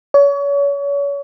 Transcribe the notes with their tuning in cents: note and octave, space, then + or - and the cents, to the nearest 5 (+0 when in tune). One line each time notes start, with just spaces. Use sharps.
C#5 +35